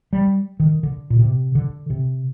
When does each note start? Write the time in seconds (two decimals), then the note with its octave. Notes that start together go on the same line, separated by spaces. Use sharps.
0.13 G3
0.60 D#3
0.83 D3
1.10 A#2
1.19 C3
1.55 D3
1.90 C3